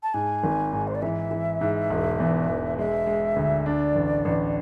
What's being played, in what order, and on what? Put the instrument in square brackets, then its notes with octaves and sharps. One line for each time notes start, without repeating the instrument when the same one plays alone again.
[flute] A5
[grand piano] G#2 [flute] G#5
[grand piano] G#1
G#2
[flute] C5
D5
[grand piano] E3 [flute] E5
[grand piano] E3
G#2
E1
E2
E1
[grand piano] G#3 [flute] E5
[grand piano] G#3
D2
[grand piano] D4 [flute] D5
[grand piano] A1
A1